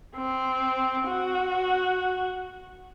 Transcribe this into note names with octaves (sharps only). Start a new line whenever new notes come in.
C4
F#4